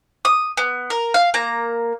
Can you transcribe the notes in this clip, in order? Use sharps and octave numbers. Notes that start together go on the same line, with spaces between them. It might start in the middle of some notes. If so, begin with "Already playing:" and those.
D#6
B3
A#4
F5
A#3 A#5